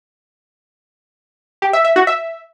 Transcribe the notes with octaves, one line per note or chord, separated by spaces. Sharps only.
G4
E5
E5
F#4
E5